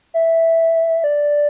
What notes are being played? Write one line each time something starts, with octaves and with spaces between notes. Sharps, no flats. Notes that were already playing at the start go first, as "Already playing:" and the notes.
E5
D5